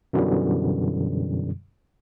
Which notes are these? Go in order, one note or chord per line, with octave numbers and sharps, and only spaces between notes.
F#2 B2 D3 E3 F#3 G3